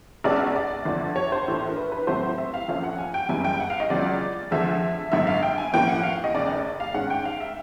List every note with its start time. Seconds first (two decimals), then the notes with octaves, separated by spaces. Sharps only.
0.24 B1 B2 G#3 C#4 D5
0.40 D5
0.56 D5
0.85 G1 F2 D3
1.16 C#5
1.32 C5
1.47 A#1 A2 E3 A3 D4
1.68 A#4
1.77 B4
1.92 B4
2.07 A2 F#3 A3 C4 C5
2.38 E5
2.54 F5
2.68 A#1 A#2 F3 A3 C#4 F5
2.84 F#5
2.98 G#5
3.14 G5
3.29 F#1 F#2 C#3 E3 G3 G#5
3.45 G5
3.60 F#5
3.70 F5
3.80 D#5
3.90 C#2 C#3 F#3 D5
4.51 F2 D3 F3 G#3 E5
5.12 G#1 F#2 D3 E5
5.27 F5
5.43 G5
5.58 G#5
5.73 A2 F3 A#3 C#4 G5
5.88 F#5
6.03 F5
6.24 D#5
6.34 F1 D#2 C#3 D5
6.80 F5
6.94 G#2 D#3 G#3 C#4 F#5
7.10 G5
7.25 F5
7.40 E5